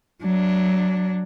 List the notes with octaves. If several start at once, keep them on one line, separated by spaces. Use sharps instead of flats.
F#3 D4